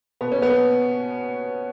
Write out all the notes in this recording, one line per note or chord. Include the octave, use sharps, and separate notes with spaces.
B2 B3
C#4
B3